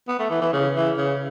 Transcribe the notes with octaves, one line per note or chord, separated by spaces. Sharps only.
B3
A3
E3
E3
C#3
E3
C#3